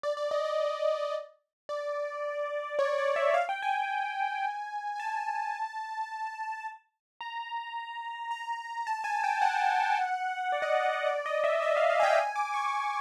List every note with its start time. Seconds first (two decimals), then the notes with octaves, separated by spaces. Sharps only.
0.03 D5
0.17 D5
0.31 D#5
0.45 D#5
1.69 D5
2.79 C#5
2.98 D5
3.16 E5
3.34 F5
3.49 G5
3.62 G#5
3.75 G#5
4.96 G#5
5.00 A5
7.21 A#5
8.31 A#5
8.87 A5
9.04 G#5
9.24 G5
9.42 F#5
10.52 D5
10.62 D#5
10.73 D5
10.83 D#5
10.92 D5
11.06 D5
11.26 D#5
11.44 E5
11.62 E5
11.77 F5
11.90 F5
12.00 G#5
12.03 G5
12.17 G#5
12.36 D6
12.54 C#6
12.72 D6